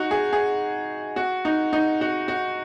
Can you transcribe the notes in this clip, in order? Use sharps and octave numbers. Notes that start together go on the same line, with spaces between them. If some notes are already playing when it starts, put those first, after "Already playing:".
Already playing: D#4 F#4
G#4
G#4
F#4
D#4
D#4
F#4
F#4